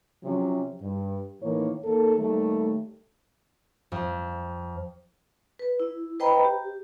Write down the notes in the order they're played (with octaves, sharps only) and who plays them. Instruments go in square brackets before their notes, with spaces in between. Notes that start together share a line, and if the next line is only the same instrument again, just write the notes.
[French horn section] C3 F3 F#3 C4 C#4
G2
A2 D#3 E3 A#3 C#5
D#2 A#3 A4
D#2 G3 A3
[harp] F2
[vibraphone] B4
E4
B4 C5 D#5 G5 A#5 B5
G4